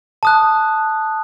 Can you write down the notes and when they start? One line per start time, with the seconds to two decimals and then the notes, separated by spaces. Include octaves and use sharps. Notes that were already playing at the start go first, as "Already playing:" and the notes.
0.23 A5 D#6 F#6